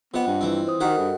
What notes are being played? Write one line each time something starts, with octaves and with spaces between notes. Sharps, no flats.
C3 B3 F4 D#5 F#5
G2
E3 C4
C5 D#6
D#3 F#4 G4 A#4 D#5 F#5
G2 A4